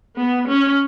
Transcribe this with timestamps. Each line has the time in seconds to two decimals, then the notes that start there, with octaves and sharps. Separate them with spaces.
0.16 B3
0.48 C#4